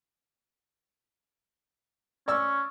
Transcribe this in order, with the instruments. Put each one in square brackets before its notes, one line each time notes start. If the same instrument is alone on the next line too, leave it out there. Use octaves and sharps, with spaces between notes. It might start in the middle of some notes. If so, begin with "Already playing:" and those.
[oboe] C#4 [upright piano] D5 C#6 E6